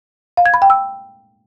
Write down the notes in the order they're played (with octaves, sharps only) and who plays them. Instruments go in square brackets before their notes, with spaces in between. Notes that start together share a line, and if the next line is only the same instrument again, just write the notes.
[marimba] F5
G#6
B5
G5
E6